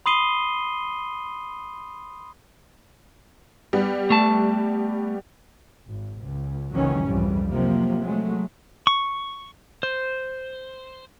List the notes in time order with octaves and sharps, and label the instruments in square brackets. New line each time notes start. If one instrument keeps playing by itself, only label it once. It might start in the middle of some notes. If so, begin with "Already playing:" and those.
[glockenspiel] B5 C6 D#6 C7 D#7 G7
[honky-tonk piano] G3 B3
[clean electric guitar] A3 A5
[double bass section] G#1
C#2
F#1 C#2 D#3 E3 F#3 C#4
C2 F2 G#2 E3 G3
C3 F3 F#3 A#3
F#3 G#3 A3
[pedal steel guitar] C#6
C5